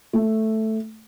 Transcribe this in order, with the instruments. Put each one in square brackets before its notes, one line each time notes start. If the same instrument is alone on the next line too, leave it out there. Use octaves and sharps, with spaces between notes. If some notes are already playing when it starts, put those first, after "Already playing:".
[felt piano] A3